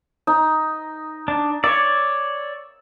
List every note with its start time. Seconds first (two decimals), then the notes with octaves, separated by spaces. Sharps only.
0.27 D#4
1.28 D4
1.64 C#5 D5 E6